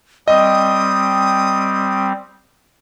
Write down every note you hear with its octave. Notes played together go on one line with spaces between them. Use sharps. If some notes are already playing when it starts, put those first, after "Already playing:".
G3 C4 D#5 D#6